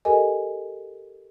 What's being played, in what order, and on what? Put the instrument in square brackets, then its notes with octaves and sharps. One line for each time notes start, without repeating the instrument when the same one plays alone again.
[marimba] G4 A4 A#4 D#5 G#5